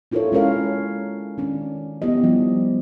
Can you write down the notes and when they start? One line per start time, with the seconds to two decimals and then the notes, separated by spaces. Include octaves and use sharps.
0.12 D4 E4 F4 A4 A#4 C#5
0.32 G#3 C#4 F4 A#4 C#5 F5
1.38 D#3 C#4 D4
2.02 B3 E4 G4 D#5
2.23 F3 G3 D#4